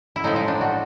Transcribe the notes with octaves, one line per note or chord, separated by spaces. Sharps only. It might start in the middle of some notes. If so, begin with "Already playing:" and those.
E4
A2 F3 G#3 D#4
D#4
D4
F#4